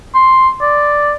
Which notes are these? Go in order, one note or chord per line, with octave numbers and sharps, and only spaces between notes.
C6
D5